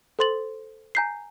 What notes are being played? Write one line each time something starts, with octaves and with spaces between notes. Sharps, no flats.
A4 C5 C6 A6 F#7
G#5 A#5 G6 B6 C7